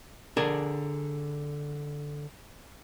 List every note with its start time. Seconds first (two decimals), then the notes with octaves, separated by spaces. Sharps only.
0.37 D3 D4 G#4 A#4 G#5